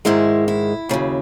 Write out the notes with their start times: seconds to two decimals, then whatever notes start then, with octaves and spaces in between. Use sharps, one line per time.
0.05 G#2 D#3 G#3 E4
0.48 E4
0.89 D#2 C#3 F#3